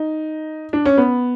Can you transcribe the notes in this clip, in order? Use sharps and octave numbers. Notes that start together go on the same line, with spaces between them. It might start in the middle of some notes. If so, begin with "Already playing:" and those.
Already playing: D#4
D4
C#4
B3